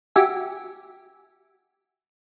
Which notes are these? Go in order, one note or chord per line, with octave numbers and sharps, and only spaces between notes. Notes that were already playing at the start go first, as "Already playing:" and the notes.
F#4 G4 E5 G#5